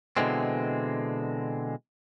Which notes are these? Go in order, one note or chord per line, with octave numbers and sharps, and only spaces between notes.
B2 D3 E3 G#3 C4